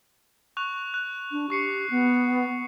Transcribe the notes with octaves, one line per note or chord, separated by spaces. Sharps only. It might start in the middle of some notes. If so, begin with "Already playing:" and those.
C#6 F#6 F7
F#6
D4
G4 C#6 C7 C#7
B3